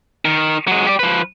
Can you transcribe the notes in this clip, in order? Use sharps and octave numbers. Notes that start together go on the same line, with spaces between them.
D#3 A#4
F#3 G#3
G4 D5
F3 B4